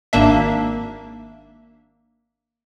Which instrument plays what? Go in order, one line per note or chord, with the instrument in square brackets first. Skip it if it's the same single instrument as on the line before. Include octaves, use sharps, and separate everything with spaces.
[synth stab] G#1 A#3 D4 E5